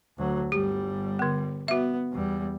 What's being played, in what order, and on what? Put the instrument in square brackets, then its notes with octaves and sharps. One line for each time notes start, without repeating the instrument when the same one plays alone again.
[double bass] D2 F#3
[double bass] G1 G3 [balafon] G4
[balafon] D3 B3
[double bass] B3 [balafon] F#4 E5
[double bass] E2 G3